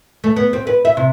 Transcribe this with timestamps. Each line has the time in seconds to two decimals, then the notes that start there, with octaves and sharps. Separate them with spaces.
0.24 A3
0.36 B3
0.53 C4
0.67 B4
0.85 E5
0.97 C3